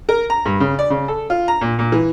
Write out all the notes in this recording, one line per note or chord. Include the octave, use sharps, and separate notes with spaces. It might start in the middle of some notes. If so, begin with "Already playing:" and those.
A#4
A#5
G2
C#3
D5
C#3
A4
F4
A#5
A#2
A#2
E3